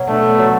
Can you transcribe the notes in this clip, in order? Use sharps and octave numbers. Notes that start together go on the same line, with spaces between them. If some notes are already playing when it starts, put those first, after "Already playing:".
Already playing: B2 F#3
A3 D4
B3
F#3